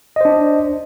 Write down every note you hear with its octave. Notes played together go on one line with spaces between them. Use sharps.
D4 C5 D#5